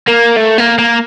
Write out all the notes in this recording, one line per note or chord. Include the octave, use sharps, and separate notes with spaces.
A#3
A3
A#3
A#3